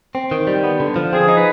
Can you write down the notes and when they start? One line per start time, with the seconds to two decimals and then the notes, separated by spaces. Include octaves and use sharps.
0.15 C4
0.31 D#3
0.47 G3
0.64 B3
0.80 D3
0.96 F3
1.13 C4 G#4
1.28 D#4
1.36 B4